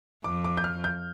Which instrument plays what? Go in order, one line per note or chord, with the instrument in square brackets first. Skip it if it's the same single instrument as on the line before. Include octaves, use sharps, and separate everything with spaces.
[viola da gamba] F2 [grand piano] D6
[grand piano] D6
G6
F6
G6